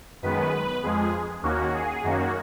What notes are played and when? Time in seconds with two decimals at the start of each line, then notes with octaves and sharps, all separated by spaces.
0.22 F#2 D#3 G#3 B3 B4
0.83 F2 F3 G#3 G#4
1.43 D#2 D#3 A#3 C#4 F#4
1.74 G#4
2.03 F#2 D#3 A#3 C#4 F#4